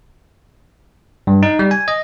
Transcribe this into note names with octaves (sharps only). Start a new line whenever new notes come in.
G2
D#4
G3
G#5
D#5